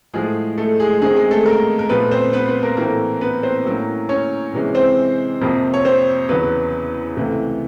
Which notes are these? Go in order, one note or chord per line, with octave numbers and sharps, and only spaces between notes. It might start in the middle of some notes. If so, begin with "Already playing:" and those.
A2 F3 G#3 A3 G#4
A3 A4
G#3 G#4
F#2 D#3 G#3 C4 D#4 G#4
G#3 G#4
A3 A4
A#3 A#4
A#4
A#2 F3 A3 B3 B4
C4 C5
B3 B4
B3 B4
A#3 A#4
A2 E3 A3 A#3 C4 A#4
B3 B4
C4 C5
A2 F#3 A#3 C#4
C#4 C#5
C3 E3 G#3 C#4
C4 C5
F2 C3 F3 A#3
C#5
C4 C5
E2 C#3 F#3 B3 B4
C#2 C3 E3 A3